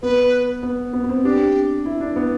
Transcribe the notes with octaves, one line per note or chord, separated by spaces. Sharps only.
B3 B4
B3
B3
B3
C4
D4 G4
E4
D4
B3